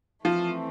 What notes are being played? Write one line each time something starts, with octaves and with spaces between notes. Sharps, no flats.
E3 F3 A3 C4